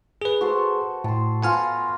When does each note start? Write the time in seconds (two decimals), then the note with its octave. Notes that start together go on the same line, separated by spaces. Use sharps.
0.22 G#4 B4
0.41 F#4 A4 C5
1.04 A2 A5 C6
1.43 B3 F4 F#5 G#5 A#5 F6